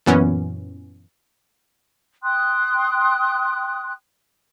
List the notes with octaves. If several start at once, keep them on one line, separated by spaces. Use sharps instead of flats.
F#2 A#2 E3 B3 C#4
G5 C6 D#6 F#6